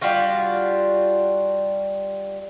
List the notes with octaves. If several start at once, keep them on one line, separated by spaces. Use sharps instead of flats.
G3 D4 F4 F#4